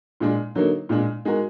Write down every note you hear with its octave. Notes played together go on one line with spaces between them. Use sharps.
A#2 G#3 D4
D3 F#3 A#3 D#4
A#2 G#3 D4
G#3 D#4 F#4 A#4